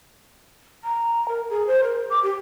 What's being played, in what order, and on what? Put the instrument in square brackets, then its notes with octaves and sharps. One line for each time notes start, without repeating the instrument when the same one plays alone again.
[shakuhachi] A#5
A#4
G#4
C5
A#4
D6
G4